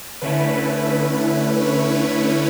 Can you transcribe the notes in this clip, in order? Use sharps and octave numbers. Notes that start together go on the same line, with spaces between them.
D3 A3 C#4 E4 B4
C#5